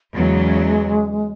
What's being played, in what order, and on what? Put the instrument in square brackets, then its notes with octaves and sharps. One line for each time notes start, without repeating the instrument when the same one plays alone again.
[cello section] E2 C#3 F#3 [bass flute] G#3